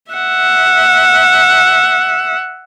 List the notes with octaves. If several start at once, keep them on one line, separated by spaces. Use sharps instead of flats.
E5 F#5